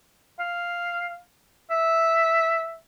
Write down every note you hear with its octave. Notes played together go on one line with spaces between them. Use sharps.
F5
E5